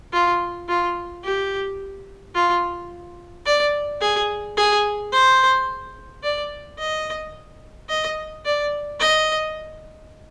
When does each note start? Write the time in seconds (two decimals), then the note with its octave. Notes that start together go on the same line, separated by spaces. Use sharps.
0.13 F4
0.69 F4
1.24 G4
2.35 F4
3.46 D5
4.01 G#4
4.57 G#4
5.12 C5
6.23 D5
6.78 D#5
7.89 D#5
8.46 D5
9.00 D#5